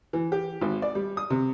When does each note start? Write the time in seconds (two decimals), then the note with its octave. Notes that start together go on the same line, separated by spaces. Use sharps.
0.13 E3
0.32 G4
0.61 G#1
0.82 D5
0.95 G3
1.17 D#6
1.30 C3